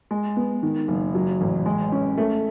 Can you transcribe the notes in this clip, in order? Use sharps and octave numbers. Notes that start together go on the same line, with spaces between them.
G#3
B3
D#3
F#1
F#3
A1
G#3
C#4
A3